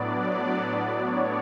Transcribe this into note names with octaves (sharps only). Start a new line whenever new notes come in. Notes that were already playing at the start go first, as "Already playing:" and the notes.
Already playing: A2 F#3 B3 D4 D5
C#5